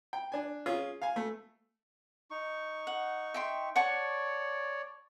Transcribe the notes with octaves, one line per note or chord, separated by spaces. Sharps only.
G5
D4 G#5
C#4 F4 G#4
F5 G#5
A3
D#4 C#6
F#5
E5 G5 C6
C#5 D5 F#5 A5 C#6